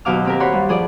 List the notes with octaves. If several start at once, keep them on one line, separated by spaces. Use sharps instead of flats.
D#2 B2 F#3 F5 D6 F6
C4 G4 A#4
C#5 F#5 B5 C6
G2
F3 G#4 D5